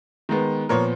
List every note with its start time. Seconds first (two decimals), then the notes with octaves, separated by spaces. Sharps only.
0.29 D#3 G#3 B3
0.69 A#2 F3 B3 A#4 C#5